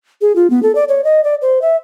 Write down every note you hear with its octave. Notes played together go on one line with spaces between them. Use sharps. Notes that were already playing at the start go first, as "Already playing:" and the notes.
G#4
F4
B3
A4
D5
C#5
D#5
D5
C5
E5